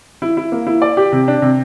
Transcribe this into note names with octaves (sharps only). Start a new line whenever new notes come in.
E4
E4
A#3
E4
D5
G4
C3
D4
C3